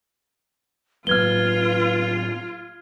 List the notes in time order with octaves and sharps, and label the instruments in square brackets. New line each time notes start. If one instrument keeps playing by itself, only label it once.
[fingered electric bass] A2 F#3 A#3 [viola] F4 [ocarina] B4 [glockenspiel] F6 G#6 G7